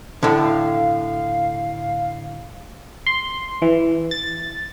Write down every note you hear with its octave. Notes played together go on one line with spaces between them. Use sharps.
A2 D3 A5
F5
C6
E3
A6